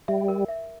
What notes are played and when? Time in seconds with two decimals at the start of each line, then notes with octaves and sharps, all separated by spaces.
0.08 G3 E5
0.28 A#4
0.48 E5